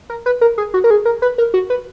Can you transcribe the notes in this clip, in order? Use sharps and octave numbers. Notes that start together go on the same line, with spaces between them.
A#4
B4
A#4
G#4
F#4
A#4
G#4
A#4
B4
A#4
F#4
B4